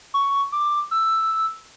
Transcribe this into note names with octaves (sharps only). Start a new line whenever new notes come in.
C#6
D6
E6